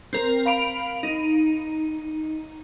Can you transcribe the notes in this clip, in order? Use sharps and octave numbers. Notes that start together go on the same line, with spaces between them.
C4 A#4
F5 B5 D7 F7
D#4